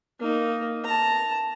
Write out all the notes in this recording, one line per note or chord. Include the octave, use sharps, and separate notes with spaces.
A#3 D#4
A5 A#5